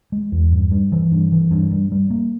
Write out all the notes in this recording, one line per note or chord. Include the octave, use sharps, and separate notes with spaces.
G#3
E2
G2
G3
E3
G2
E3
G2
G3
G3
A#3